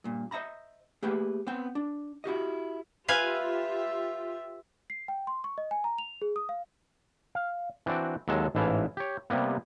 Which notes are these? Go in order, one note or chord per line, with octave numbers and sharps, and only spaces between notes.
G2 A#2
C5 D#5 E5 A#5 B5
A3 A#3 G4 G#4 B4 G5
B3 C4 G5
D4
E4 F#4 G4 D#5
F4 G4 B4 E5 F5 G#5
C7
G5
C6
C#6
D#5
G#5
A#5
F7
G#4
D#6
F5
F5
E3 C4 D4 F#4 D5
D#2 F#3 G#3 A4 A5
A1 G#2 E3 E4 F5 A5
G4 C#5
C3 G3 A#3 B3